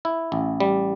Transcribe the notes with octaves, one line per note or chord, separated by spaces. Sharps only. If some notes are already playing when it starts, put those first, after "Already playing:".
E4
A1
G3